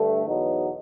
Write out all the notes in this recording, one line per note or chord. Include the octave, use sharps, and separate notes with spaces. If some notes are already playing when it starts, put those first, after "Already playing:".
Already playing: G2 D3 A3
E2 B2 F#3 B3 D#4